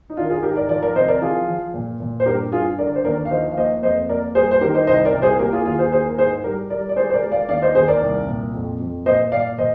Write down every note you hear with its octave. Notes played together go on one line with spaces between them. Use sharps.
D#4
D#3 D4 F4
A#4
F4 G#4
G#2 G4 A#4
A#4 D5
F3 A#4 D5
A#4 D5
C3 C5 D#5
A#4 D5
F3 F4 G#4
F3
A#2
A#2
C5
G2 G4 A#4
G2 F4 G#4
D3 A#4 D5
C5
D#2 A#4 D5
F5
F3 C5 D#5
F5
A#3 C5 D#5
F2 C5 D#5
A#3 A#4 D5
G3 G#4 C5
C5
D#3 G4 A#4
C5 D#5
C2 C5 D#5
A#4 D5
C2
G#4 C5
A#3 G4 A#4
F4 G#4
D#2 F4 G#4
G#4 C5
A#3 G#4 C5
A#4
G#2 G#4 C5
G3 G4 A#4
G3 A#4 D5
D5
G#3 G#4 C5
C5
A#4 D5
G#3
D5 F5
D#2 D5 F5
C5 D#5
D#2 G#4 C5
A#4 D5
C2
A#2
F2
F2
A#2 C5 D#5
A#2 D5 F5
A#2 C5 D#5